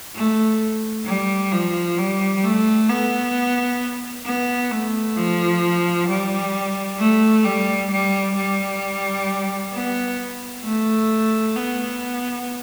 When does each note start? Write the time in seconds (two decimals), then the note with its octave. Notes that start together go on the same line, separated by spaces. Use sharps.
0.15 A3
1.06 G3
1.52 F3
1.98 G3
2.44 A3
2.89 B3
4.26 B3
4.71 A3
5.17 F3
6.08 G3
6.99 A3
7.44 G3
7.91 G3
8.36 G3
9.73 B3
10.64 A3
11.55 B3